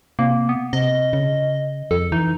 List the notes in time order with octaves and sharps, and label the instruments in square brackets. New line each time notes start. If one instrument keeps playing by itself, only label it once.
[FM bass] C3 [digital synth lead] A#3
[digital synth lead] B3
[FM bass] C3 [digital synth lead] D#5
[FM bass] C#3
[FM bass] F2 [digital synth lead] A4
[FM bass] E3 [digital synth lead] D#4